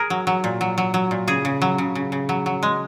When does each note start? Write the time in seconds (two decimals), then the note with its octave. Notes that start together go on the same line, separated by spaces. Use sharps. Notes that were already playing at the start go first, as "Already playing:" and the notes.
Already playing: G#4 A#4
0.10 F#3
0.27 F#3
0.44 A#2
0.61 F#3
0.78 F#3
0.94 F#3
1.11 A#2
1.28 C#3 G#4
1.45 C#3
1.62 F#3
1.78 C#3
1.95 C#3
2.12 C#3
2.29 F#3
2.46 F#3
2.63 G#3